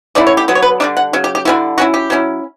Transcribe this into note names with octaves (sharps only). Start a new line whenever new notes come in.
D3 A3 C#4 E4 D5
C#5
G4
D3 F#3 B3 B4
C#5
B4
D3 G3 D4 D5
F#5
C#3 F#3
G4
G4
D3 G3 C#4 E4 F#4
F#3 C#4 E4 F#4
G4
F#3 C#4 E4